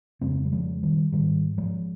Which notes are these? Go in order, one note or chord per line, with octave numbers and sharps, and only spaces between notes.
F2 C#3 G#3 C4
G3
F3 G#3
D#3 G3
G#2 D#3 G3
F3 G#3